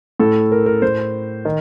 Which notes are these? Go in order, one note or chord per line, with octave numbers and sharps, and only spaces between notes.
A2 A4
A#4
A#4
A2 C5
D#3